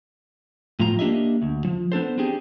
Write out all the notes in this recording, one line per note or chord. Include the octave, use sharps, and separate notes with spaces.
A2 F3 F4 A#5
A#3 D4 G4 D#5 E5
D2
F3
B3 D4 A4 C5
C4 D4 G4 G#4